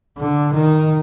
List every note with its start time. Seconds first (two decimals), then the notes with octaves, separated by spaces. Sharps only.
0.18 D3
0.55 D#3